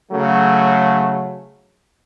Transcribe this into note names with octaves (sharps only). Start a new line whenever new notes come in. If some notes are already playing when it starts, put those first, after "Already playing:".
C#3 F#3 A3